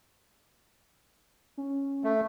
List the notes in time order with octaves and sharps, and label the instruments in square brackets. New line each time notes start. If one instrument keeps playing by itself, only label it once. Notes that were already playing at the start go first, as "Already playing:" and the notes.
[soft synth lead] C#4
[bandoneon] A3